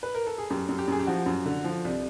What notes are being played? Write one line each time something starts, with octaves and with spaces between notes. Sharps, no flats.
B4
A#4
A4
G#4
F#2 G4
F#2
G4
F#2 G#4
G4
F3 F#4
F#2
D3
F3
C2